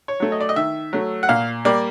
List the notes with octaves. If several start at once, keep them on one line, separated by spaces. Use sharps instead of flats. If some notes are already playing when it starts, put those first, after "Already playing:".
C#5
F#3 A3
D#5
D5
D#5
D#3 E5
F#3 A3
F#5
A#2 F5
G3 A#3 D5